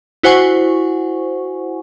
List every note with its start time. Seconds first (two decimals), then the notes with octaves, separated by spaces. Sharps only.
0.23 E4 F#4 C5 F#5 G#5 C#6